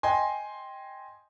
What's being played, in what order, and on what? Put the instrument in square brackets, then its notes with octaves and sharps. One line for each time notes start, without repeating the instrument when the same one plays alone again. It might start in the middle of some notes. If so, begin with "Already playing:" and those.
[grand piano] D#5 G5 G#5 C6